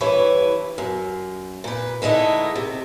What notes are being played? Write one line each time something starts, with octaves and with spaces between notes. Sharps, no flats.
G2 E3 E4 B4 C#5
F#2
A#2 B4
D3 G#3 A3 D#4 E4
C3